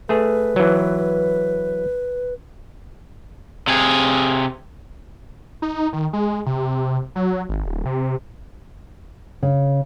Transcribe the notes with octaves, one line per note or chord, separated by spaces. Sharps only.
A3 G#4 B4
E3 F#3
C3 G#4
D#4
D#3
G#3
C3
F#3
G#1
D1
C3
C#3